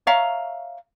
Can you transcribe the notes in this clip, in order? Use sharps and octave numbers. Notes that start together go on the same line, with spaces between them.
C#5 E5 F5 A#5